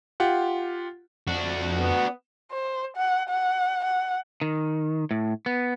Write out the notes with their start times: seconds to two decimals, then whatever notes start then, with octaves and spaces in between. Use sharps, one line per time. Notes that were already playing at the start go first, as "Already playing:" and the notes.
0.20 F4 G4 F#5
1.27 F2 D4 F#4
1.74 B3
2.52 C5
2.96 F#5
3.29 F#5
3.84 F#5
4.42 D#3
5.11 A2
5.46 B3